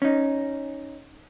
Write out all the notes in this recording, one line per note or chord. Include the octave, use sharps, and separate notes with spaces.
C#4 D#4